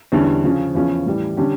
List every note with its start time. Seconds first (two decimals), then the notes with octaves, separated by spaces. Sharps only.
0.12 E2 D3 G3 C#4 E4
0.44 C#3 F3 C#4
0.75 E2 C#3 F3 C#4
1.06 A2 E3 G3
1.37 D3 G3 C#4 G4